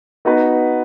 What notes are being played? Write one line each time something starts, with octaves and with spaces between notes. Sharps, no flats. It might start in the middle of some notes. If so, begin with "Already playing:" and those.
B3 D#4 F#4 B4